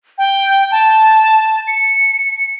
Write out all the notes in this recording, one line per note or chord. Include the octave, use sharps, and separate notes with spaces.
G5
A5
C#7